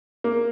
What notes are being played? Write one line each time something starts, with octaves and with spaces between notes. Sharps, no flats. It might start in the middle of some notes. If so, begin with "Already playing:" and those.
A#3